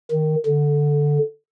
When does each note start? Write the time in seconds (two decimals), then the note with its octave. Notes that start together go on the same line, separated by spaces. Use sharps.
0.11 D#3
0.46 D3